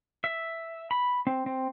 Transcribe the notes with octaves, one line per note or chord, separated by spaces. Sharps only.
E5
B5
C4
C4